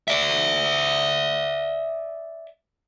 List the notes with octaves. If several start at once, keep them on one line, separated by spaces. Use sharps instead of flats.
D5 E5